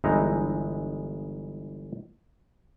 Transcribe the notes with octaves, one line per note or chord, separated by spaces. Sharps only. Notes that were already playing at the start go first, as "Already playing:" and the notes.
G1 E3 G#3 D#4 E4 A#5